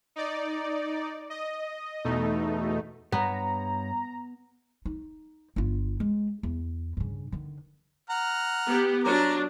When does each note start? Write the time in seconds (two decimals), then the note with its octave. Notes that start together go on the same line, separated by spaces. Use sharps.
0.16 D#4 D5
1.30 D#5
2.05 E2 B2 A3 D#4
3.12 G2 G3 B3 C#5 A#5
4.85 D#4
5.56 G1 F4
6.00 G#3
6.43 E2
6.97 G2 C#3
7.32 D3 D#3
8.10 F#5 A#5 F6
8.67 B3 G4
9.04 F#3 D4 A#4 A#5 D6